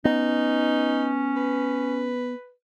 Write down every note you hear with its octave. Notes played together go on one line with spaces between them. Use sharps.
B3 C#4 D#4
B4